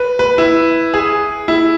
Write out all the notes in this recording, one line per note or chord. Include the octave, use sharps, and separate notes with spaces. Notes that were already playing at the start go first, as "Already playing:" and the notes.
Already playing: B4
B4
E4
G#4
E4